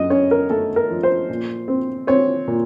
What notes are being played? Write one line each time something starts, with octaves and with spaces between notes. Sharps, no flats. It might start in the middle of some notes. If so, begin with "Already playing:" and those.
Already playing: F#2 D#5
C#4 C#5
A#4
A3 A4
A#4
F3
C5
A#2
C4
C4 C#5
A#2